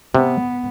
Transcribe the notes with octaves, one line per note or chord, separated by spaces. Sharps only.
C3 B3